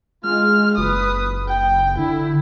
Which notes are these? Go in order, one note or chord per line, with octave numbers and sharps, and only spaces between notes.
G#3 F4 F6
F#1 B4 D#6
G5
D3 E4